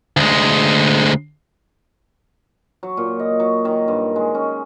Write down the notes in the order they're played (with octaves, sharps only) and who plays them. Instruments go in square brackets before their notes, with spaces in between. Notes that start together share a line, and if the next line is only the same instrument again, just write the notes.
[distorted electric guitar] D2 G#3
[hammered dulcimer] F#3
A#2
D#5
F#3
D#3
G2
G#3
C#4